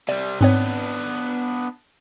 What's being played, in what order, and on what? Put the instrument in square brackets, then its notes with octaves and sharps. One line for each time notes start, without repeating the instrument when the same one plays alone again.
[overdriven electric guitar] C3 G3 [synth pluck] D5
[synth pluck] G#2 C4 C#5 [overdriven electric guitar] B3 D4